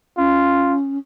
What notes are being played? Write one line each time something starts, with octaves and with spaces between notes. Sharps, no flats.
C#4 F4